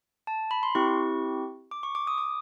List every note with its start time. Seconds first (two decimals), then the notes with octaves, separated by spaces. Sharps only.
0.27 A5
0.51 B5
0.63 C6
0.75 C4 E4 G4 C#6
1.71 D6
1.83 C#6
1.95 D6
2.07 D#6
2.18 D6